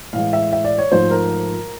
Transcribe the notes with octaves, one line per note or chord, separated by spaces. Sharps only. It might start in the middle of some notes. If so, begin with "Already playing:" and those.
A2 E3 G#3 F5
E5
E5
D5
C#5
G#2 F3 A3 C5
A#4